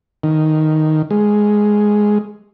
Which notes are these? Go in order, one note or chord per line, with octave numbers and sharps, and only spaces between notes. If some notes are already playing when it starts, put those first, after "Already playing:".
D#3
G#3